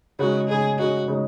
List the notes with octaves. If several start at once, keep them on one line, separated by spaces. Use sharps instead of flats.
C#3 G#3 D#4 F#4
C#3 G#3 D#4 G#4
C#3 G#3 D#4 F#4
C#3 G#3 D#4